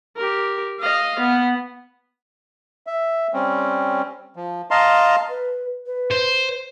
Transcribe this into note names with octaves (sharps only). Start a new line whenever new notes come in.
G4 A#4
D#5 F5
B3
E5
G3 C4 C#4
F3
D#5 F5 A5 A#5 C6
B4
B4
C5